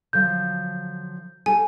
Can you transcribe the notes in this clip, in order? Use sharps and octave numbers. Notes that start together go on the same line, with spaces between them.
D3 F3 F#3 G6
G4 A4 G#5